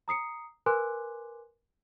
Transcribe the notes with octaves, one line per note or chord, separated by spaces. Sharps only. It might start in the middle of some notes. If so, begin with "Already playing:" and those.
A#5 D#6 C7 C#7
A#4 B4 G#5 C6 D6 F#6